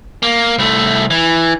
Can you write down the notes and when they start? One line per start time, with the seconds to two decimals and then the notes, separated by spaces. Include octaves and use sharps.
0.23 A#3
0.58 C2 A3
1.10 E3